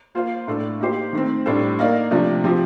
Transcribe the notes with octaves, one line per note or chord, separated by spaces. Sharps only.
A#3 F4 C5 F5
A2 A3 D4 A4
A#3 D#4 G4 C5
D#3 A3 C4
A2 G3 D4 A4 C5
A#3 D#4 A#4 D5 F5
C3 F3 A3 D4
F3 C4 G4